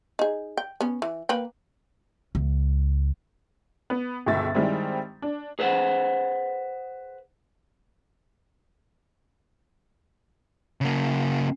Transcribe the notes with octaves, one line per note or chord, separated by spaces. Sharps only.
D#4 G#4
G5
B3 C#4
E3
A#3 B4 G5
C#2
B3
G1 C#2 B2 E5 A6
D#3 G3 G#3 C4 E4
D4
G#4 B4 C5 F5 F#5
C#3 A#3